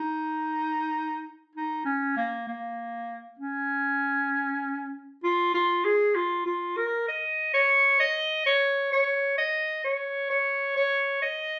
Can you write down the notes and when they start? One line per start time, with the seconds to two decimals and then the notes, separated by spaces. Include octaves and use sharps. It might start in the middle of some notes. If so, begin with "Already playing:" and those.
Already playing: D#4
1.55 D#4
1.86 C#4
2.17 A#3
2.48 A#3
3.39 C#4
5.24 F4
5.54 F4
5.85 G#4
6.15 F4
6.46 F4
6.77 A#4
7.08 D#5
7.54 C#5
8.00 D#5
8.46 C#5
8.92 C#5
9.38 D#5
9.84 C#5
10.30 C#5
10.76 C#5
11.22 D#5